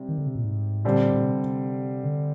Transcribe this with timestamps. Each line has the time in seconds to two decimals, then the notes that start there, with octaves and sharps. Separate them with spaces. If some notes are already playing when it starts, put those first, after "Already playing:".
Already playing: C3 G3 C4
0.09 D#3
0.18 D3
0.27 C3
0.35 A#2
0.44 G#2
0.85 A#2 D3 G3 C4
1.14 A#2
1.25 C3
2.04 D3